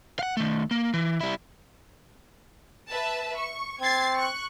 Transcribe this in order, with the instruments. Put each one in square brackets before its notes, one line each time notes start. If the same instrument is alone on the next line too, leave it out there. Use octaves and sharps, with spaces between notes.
[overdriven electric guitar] F5 F#5
D#3 A3
A#3
E3
G3 E4
[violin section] B4 E5 A5
C#6
[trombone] C4 [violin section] G#6 A6 C7
[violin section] C#6 F#6